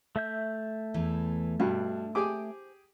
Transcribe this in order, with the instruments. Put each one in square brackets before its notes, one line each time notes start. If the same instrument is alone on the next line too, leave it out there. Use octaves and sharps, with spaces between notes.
[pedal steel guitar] A3 E5 G6
[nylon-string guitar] E2 E3
[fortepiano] G2 B2 [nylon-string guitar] D4
[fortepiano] G4 G#4 D6 [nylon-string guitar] C5 G#5